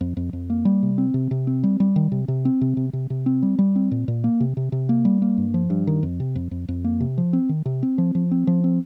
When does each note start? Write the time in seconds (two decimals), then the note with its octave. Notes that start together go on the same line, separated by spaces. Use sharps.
0.01 F2
0.17 F2
0.33 F2
0.50 A#3
0.65 G3
0.83 C3
0.98 C4
1.14 C3
1.31 C3
1.47 C4
1.63 G3
1.80 G3
1.96 D#3
2.12 C3
2.28 C3
2.45 C4
2.61 C3
2.77 C3
2.93 C3
3.10 C3
3.26 C4
3.43 G3
3.59 G3
3.76 C4
3.91 A#2
4.08 A#2
4.24 A#3
4.40 C3
4.57 C3
4.72 C3
4.89 A#3
5.05 G3
5.22 A#3
5.38 G2
5.54 F3
5.70 G2
5.87 D#3
6.03 F2
6.20 C3
6.35 F2
6.51 F2
6.68 F2
6.84 A#3
7.00 C3
7.18 F3
7.33 C4
7.49 D#3
7.65 C3
7.83 C4
7.98 F3
8.15 F3
8.31 C4
8.47 F3
8.64 C4